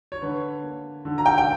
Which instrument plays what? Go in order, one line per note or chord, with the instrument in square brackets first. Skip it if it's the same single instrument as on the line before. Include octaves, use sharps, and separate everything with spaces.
[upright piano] C#5
D3 B4
A#3
D3
A#5
G5
G5